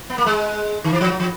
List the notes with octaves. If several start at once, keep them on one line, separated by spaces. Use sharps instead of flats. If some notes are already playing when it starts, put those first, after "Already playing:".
B3
A#3
G#3
D#3
E3
F3
F#3
F3